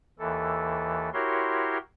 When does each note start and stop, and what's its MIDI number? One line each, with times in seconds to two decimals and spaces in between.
0.19 1.10 39
0.19 1.10 52
0.19 1.10 69
1.14 1.78 64
1.14 1.78 66
1.14 1.78 67
1.14 1.78 70
1.14 1.78 73
1.14 1.78 84